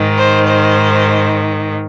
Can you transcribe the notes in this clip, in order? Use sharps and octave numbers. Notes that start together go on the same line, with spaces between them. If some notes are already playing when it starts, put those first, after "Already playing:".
Already playing: G#2 D#3
C5
C5